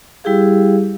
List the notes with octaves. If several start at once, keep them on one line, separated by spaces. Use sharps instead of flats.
G3 E4 G4 G#4 F5